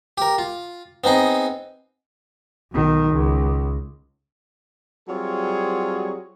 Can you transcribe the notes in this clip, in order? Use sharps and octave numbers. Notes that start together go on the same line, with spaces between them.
G4 A#4
F4
B3 C4 D#4 G#4 D#5
B1 D#3
C#2
F#3 G3 C4 F4 G#4 C#5